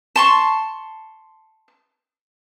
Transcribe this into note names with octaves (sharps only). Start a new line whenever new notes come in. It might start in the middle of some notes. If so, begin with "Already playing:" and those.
A5 C6 C#6